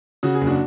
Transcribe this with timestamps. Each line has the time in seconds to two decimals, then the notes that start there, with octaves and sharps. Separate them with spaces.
0.23 C#3 F#4
0.35 G#4
0.41 F#1
0.47 D4 F#4